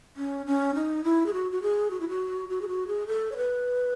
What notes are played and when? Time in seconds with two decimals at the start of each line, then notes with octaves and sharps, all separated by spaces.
0.17 C#4
0.46 C#4
0.75 D#4
1.04 E4
1.26 G#4
1.33 F#4
1.52 F#4
1.62 G#4
1.91 F#4
2.00 E4
2.09 F#4
2.49 F#4
2.62 G#4
2.68 F#4
2.87 G#4
3.07 A4
3.32 C#5
3.36 B4